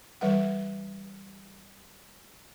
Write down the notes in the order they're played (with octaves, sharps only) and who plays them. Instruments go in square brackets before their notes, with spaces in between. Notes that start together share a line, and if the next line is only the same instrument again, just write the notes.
[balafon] E3 G3 B4 F#5